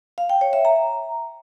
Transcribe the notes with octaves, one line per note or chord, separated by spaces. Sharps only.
F5
G5
C#5
E5
A#5